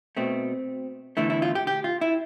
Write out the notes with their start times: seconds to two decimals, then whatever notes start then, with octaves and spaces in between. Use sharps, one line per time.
0.17 B2 A3 C4
1.17 E2 D3 A3 E4
1.30 E4
1.42 F4
1.55 G4
1.67 G4
1.84 F4
2.01 E4